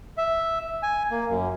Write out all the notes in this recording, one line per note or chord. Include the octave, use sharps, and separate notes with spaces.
E5
G#5
A#3
F#2